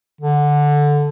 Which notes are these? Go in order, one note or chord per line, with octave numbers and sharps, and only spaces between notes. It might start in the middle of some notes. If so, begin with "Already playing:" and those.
D3